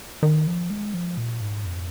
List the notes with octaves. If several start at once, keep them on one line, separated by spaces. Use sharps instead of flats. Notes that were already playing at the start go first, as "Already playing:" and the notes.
D#3
F3
G#3
F3
A#2
G#2
F2